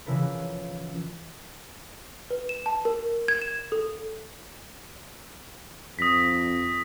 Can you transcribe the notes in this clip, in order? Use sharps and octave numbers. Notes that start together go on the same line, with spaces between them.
C#3 E3 F3 E4 A#4 B4
B4
E7
A5
A#4
G#6
E7
A4
F2 D#6 A#6 B6